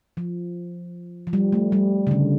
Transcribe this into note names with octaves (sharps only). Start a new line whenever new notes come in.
F3
F3
G3
A3
G3
C#3
D3